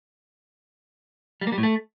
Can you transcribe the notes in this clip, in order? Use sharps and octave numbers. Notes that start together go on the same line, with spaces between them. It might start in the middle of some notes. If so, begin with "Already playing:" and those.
G3
A#3
G3
A2
A3